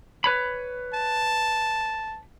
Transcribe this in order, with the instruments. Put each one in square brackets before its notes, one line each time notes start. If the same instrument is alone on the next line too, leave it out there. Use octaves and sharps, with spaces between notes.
[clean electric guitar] B4 C#5 B5
[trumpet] A5